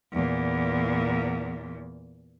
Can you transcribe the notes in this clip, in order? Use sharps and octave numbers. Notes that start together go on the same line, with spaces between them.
E2 A#2